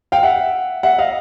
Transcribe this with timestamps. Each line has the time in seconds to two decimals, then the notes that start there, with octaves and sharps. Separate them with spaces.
0.12 F5 G5
0.23 E5 F#5
0.83 E5 F#5
0.98 D#5 F5